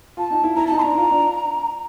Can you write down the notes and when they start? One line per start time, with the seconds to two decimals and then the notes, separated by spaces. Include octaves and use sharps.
0.17 F4 A5
0.30 D#4
0.44 E4
0.56 E4 A#5
0.66 D#4 A5
0.78 C6
0.81 D4 A#5
0.98 F4
1.11 D4